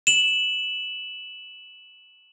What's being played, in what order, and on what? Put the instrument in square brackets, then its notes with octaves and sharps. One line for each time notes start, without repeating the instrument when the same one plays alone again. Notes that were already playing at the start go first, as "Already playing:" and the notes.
[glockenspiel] E7 F#7